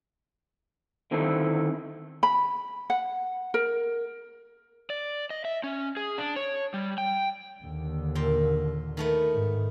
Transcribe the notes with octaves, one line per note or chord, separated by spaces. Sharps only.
D3 D#3 C4 E4 A4
B5
F#5
A#4
D5
D#5
E5
C#4
G#4
D4
C#5
G3
G5
D#2 D3
A#2 G5
D#3 A3 B3
G#2